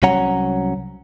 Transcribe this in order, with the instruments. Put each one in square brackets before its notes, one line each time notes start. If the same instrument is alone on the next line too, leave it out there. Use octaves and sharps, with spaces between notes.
[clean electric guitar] C2 F#3 C#4 C#5 F#5 A#5